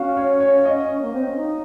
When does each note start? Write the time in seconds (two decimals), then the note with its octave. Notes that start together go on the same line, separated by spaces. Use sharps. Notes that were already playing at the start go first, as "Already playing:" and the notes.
Already playing: C#4 F#4 F5
0.17 C#5
0.40 C#5
0.65 D#5
1.02 A#3
1.14 C4
1.25 C#4
1.37 D#4